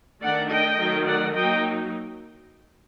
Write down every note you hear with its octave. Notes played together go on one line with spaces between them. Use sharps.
D#3 A3 D4 D5 F#5
D#5 G5
D#3 F#3 A3
D5 F#5
F#3 A#3 D#4 D#5 G5